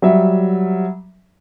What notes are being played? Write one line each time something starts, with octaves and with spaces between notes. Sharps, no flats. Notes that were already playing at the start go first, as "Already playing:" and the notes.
F#3 G3 E5